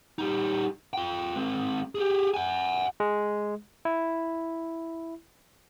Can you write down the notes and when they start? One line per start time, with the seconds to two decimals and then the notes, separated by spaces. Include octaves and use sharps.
0.18 G3 D#4
0.93 F4 G5
1.36 G#3 C4
1.95 G4 G#4
2.34 F#5 G#5
3.00 G#3
3.85 E4